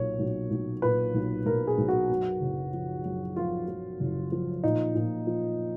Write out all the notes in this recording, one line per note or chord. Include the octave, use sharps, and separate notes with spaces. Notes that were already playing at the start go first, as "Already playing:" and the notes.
Already playing: B1 A#2 C#5
B1
B1
A#2 B4
B1
B1 A#4
G#4
B1
F#4
F#2
F#1
F3
F#2
F3 F4
F3
F#1
F3
A#2 D#4
A#2
F3